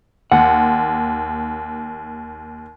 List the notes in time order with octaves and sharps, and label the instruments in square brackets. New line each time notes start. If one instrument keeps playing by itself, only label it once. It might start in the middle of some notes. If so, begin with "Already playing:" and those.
[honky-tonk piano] D#2 [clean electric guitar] F#5